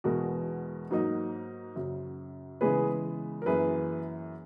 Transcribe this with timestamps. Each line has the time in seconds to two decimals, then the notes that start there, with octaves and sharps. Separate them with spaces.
0.04 E2 B2 G#3 B3 F#4 A#4
0.90 G#2 F#3 A#3 D#4
1.75 F#2 C#3 F#3
2.61 C#3 E3 G#3 B3 G#4 B4
3.42 A#4
3.46 F#2 E3 A#3 G#4 B4